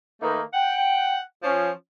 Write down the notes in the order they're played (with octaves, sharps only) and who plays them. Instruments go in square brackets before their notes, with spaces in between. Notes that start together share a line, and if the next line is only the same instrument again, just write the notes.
[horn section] D#3 A3 A#3 D#4 B4
F#5 G5
F3 C#4